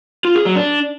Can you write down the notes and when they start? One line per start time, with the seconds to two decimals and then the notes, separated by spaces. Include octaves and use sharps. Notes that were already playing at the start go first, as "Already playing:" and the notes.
0.25 F4
0.35 G#4
0.45 F#3
0.56 D4